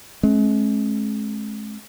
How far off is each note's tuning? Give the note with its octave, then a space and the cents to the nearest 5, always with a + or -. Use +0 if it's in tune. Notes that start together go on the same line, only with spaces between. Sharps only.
G#3 +40 C#4 -45